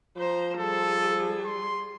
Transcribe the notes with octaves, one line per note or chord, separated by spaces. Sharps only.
F3 C5 A#5
G3 G#4 A4
C6